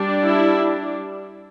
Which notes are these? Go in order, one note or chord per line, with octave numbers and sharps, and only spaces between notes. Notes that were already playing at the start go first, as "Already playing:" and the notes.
Already playing: G3 D4
E4